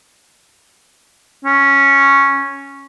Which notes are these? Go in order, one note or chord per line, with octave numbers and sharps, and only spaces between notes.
C#4